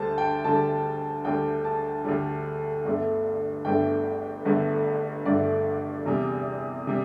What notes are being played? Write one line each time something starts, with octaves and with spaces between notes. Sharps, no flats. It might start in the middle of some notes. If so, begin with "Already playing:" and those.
Already playing: D2 D3 G3 C5 A5
G5
D2 D3 G3 A5
D2 D3 G3 G5
A5
D2 D3 G3
G1 G2 D3 A3
G1 G2 D3 A3 G5
G1 G2 D3 A3
G1 G2 D3 A3 D5
E2 C3 G3
C3 G3